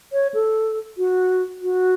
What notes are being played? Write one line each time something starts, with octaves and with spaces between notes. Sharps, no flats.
C#5
A4
F#4
F#4